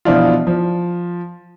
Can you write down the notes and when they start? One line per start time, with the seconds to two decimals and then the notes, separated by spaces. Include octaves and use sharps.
0.05 B2 E3 F3 D4 E4 F4
0.47 F3